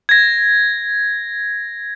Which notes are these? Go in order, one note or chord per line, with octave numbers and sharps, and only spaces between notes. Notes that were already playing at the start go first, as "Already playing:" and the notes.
G#6 A#6